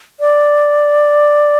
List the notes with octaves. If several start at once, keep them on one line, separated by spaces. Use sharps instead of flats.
D5